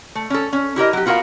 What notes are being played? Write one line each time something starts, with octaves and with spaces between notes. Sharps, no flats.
A3
C#4 A4
C#4
E4 G4 A#4 D#5
F#3 G4
B3 F4 F#4 G#4 A#4 F5